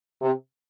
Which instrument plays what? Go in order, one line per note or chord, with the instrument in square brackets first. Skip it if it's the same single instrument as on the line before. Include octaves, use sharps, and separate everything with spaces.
[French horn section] C3